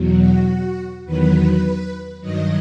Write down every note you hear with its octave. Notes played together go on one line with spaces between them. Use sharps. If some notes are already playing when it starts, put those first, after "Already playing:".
Already playing: E2 B2 F#3
F#4
E2 D#3 F#3 B4
G2 D#3 F#3 D#5